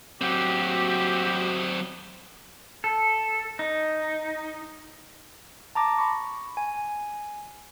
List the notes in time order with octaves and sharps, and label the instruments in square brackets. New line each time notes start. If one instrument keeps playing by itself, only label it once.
[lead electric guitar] F#3 C4 [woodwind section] F#4 G4
[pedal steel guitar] A4
D#4
[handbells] A5 A#5 D6 A#6
B5 C#6
G#5